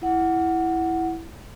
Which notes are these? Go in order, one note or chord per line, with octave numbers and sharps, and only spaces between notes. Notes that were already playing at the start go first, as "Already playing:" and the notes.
E4 F#5